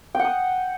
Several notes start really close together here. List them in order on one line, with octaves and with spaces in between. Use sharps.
G5 F#5 D#6